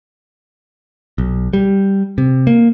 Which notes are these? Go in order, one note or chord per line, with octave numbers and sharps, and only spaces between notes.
B1
G3
C3
A#3